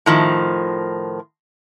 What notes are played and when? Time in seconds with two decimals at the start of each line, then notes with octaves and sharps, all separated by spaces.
0.06 A2 D#3 F3